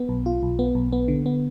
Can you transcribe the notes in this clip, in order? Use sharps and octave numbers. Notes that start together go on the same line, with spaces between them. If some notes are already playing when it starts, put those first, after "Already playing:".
Already playing: B3
B1
F4
B1
B3
B1
B3
D3
B3